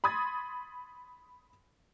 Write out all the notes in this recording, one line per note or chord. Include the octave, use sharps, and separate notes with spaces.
B5 C6 D#6 G#6 A6